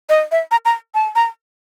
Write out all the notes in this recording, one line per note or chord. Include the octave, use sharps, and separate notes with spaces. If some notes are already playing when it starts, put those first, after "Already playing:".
D#5
E5
A#5
A#5
A5
A#5